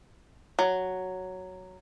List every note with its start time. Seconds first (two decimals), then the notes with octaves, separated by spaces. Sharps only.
0.59 F#3